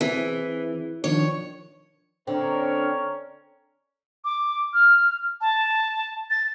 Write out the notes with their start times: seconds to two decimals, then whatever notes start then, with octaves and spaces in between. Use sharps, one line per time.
0.01 E3 C4 E4 G#4
1.04 D#3 F3 D4 C#5
2.27 D3 C4 C#4 A#4 C#5
4.25 D6
4.74 F6
5.41 A5
6.30 A6